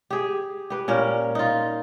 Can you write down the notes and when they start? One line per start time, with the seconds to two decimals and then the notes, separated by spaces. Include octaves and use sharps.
0.10 G4 G#4
0.70 G4 B4
0.88 A#2 C#4 A#4
1.35 D#4 F4